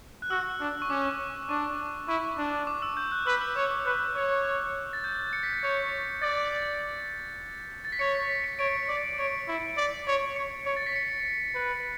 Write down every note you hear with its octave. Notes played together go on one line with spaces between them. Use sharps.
F#6
F#4 E6
D4
C#6
C#4 D6
D4 C#6
E4 C#6
D4
D6
E6
G6
F#6
B4 E6
E6
C#5 D6
D6
B4 F#6
C#5
A6
G6
C#7
B6
A6
C#5 G6
D5 A6
A6
B6
C#5 C#7
B6
B6
C#7
C#5 D7
D5
C#5 D7
E4
D5
C#5
C#5 C#7
C#5
A6
B6
C#7
B4